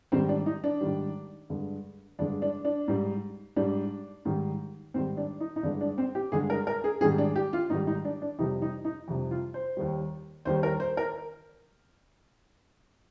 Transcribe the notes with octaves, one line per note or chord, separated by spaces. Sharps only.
G#2 D#3 G3 C4
D4
D#4
D4
G#2 D#3 G3
G2 D3 G#3
G2 D3 G#3 D4
D4
D4
G#2 G3
G#2 G3 D4
G#2 D#3 G3
G#2 D#3 G3 C4
D4
D#4
D#4
G2 D3 G#3 D4
D4
C4
G4
G2 D3 G#3 G#4
A#4
A#4
G#4
G#2 D#3 G3 G#4
D4
G4
F4
G#2 D#3 G3 D#4
D#4
D4
D4
F2 C3 G3 D#4
D#4
D#4
F2 C3 G3
F4
C5
D#2 D#3 G3
D#2 D#3 G3 C5
A#4
C5
A#4